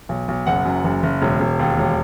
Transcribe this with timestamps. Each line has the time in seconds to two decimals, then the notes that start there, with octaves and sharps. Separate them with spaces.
0.09 B1
0.28 B1
0.46 F#1 F#5
0.65 F#2
0.84 F#1
1.03 F#1
1.22 E1
1.40 E1
1.59 D#2
1.78 E1